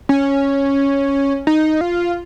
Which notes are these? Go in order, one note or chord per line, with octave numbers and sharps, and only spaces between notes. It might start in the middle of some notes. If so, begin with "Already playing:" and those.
C#4
D#4
F4